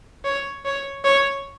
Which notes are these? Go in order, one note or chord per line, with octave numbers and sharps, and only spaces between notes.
C#5
C#5
C#5